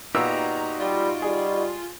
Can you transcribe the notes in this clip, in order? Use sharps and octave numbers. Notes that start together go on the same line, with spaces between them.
A#2 B3 D#4 F#4 G4 A#5 E6
G3 F4
G3 G#4